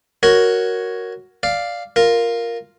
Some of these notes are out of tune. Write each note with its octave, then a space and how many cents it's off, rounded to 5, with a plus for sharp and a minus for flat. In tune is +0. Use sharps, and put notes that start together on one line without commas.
F#4 +0 A#4 +0 C#5 +5
D5 +0 F5 +0
F4 +0 A#4 +0